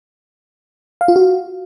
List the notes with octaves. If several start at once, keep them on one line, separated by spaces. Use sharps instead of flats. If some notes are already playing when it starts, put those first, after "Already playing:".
F5
F4
F#4